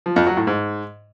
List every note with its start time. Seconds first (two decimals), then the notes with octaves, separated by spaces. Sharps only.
0.06 F3
0.16 F2
0.27 F#3
0.37 A2
0.47 G#2